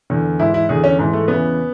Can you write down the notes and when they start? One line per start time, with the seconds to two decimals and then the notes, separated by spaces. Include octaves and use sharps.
0.10 E2 D3
0.39 G#2 E3 E4
0.54 E4
0.69 E2 D3 G#4
0.84 C#4
0.99 G#2 E3
1.13 A3
1.28 E2 C#3 E3 B3